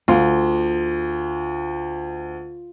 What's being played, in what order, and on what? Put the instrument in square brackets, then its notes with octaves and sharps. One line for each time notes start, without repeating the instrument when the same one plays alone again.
[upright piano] D2 [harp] F4